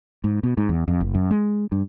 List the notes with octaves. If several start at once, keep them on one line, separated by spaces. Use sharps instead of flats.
G#2
B2
G#2
E2
F2
F#1
F#2
G#3
G2